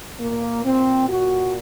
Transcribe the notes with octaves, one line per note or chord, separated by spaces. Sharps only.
A#2 A#3
C4
F#4